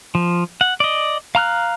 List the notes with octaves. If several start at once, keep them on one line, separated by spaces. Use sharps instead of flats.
F3
F#5
D5 D#5
F5 A#5 F6 F#6